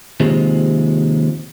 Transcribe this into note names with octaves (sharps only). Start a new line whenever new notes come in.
D#2 C3 F3 G#3